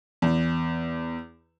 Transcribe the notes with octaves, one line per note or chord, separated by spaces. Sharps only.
E2